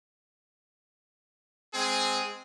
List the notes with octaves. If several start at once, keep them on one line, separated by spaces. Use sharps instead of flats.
G#3 C4 G#4